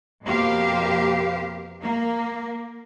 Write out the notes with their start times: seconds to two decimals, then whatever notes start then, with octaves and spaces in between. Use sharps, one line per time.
0.23 F2 B2 A#3 G4 C5 F5
1.81 A#3